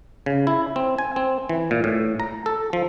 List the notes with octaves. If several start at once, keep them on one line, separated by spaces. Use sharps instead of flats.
C#3
E4
C4
G#5
C4
E3
A#2
A2
A#5
A4
F3